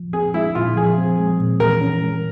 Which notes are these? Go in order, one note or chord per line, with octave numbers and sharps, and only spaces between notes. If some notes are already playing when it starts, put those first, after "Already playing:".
Already playing: F3
C4 G#4
G#3 E4
A#2 F4
F3 G#4
C4
G#3
A#2
E3 A#4
C#4
G#3